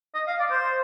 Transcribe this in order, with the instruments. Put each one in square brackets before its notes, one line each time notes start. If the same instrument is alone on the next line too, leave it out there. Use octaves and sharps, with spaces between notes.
[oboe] D#5
F5
D5
C5